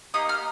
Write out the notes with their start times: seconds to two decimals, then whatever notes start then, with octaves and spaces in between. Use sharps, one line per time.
0.14 A#3 D#4 G4 D#6
0.29 F6